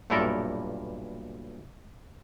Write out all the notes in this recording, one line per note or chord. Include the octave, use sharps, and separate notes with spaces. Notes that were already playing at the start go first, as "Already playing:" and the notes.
B1 G2 A#2 E4 A4 A#4